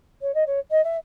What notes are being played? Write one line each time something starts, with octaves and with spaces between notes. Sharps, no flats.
C#5
D#5
C#5
D#5
E5